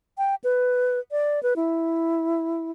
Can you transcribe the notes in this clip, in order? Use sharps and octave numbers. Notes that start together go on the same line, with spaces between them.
G5
B4
D5
B4
E4